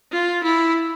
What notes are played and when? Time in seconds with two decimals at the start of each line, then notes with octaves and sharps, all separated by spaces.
0.12 F4
0.44 E4